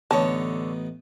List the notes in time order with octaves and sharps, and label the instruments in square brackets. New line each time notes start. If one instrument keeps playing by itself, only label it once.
[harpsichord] A1 B3 D#4 [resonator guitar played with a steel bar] D3 C#5 [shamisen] A5